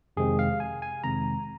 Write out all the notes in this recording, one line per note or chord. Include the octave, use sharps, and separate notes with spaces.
F2 C3 D#3 G#3 C4 G#4
F5
G#5
G#5
F2 C3 D#3 G#3 C4 A#5